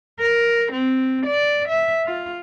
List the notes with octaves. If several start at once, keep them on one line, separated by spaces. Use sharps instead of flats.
A#4
C4
D5
E5
F4